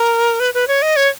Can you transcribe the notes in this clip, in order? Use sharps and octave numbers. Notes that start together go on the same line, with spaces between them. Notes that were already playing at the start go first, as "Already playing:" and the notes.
Already playing: A#4
B4
B4
C#5
D#5
C#5